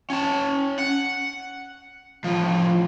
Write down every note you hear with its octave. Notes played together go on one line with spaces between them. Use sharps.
C#4 A5
F#5
A2 F3